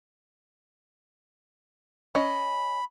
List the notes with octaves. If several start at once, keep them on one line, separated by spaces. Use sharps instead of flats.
C#4 D#5 B5